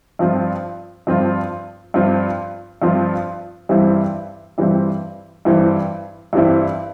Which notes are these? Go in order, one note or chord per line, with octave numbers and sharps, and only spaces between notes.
G2 F3 C4 F4
G2 F3 C4 F4
G2 F3 C4 F4
G2 F3 C4 F4
G2 E3 G3 C4 E4
G2 E3 G3 C4 E4
G2 E3 G3 C4 E4
G2 E3 G3 C4 E4